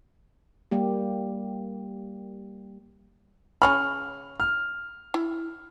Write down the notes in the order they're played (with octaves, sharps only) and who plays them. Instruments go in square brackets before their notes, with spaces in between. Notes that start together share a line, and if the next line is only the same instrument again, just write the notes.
[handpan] G3 A#3 G4
[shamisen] C#3 C#4 B5 [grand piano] F6
[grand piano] F6
[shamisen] E4